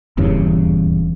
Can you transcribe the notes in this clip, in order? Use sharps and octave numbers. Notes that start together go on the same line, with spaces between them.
D#1 E2 G2 C#3